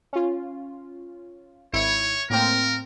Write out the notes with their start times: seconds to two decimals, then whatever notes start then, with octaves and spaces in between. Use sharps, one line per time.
0.13 C#4 F4
1.73 G#1 E4 C#5 D7
2.30 A2 A#3 C4 A#4